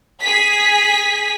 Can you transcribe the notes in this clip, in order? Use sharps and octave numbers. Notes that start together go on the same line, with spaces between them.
G#4 B6